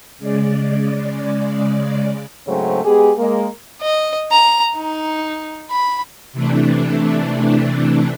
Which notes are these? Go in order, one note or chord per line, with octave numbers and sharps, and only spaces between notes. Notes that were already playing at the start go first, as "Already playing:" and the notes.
C#3 G#3 D5
G#2 C#3 F#3 A3 C4 C#4
G#3 B3 G4 G#4
G#3 A#3
D#5
A#5
D#4
B5
C3 E3 A3 D4